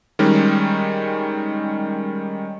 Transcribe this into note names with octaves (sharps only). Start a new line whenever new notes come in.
D#3 G3 G#3 C#4